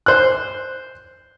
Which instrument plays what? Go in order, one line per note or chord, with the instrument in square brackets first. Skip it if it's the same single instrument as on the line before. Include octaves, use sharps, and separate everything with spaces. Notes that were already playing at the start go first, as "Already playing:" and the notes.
[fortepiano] C5 F#6